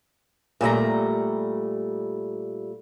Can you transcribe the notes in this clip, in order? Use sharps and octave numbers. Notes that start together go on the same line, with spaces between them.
A#2 G3 A3 A#5